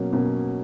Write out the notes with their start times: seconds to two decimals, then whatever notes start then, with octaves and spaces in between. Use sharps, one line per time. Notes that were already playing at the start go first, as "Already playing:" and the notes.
Already playing: B2 F#3 A#3 C#4
0.13 B2 F#3 A#3 C#4